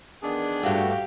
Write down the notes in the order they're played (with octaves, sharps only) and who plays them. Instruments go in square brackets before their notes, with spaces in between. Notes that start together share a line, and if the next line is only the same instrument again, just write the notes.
[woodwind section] D#3 E3 B3 [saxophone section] D4 G#4
[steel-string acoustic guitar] G2 A3 [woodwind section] F#4 [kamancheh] G4 F5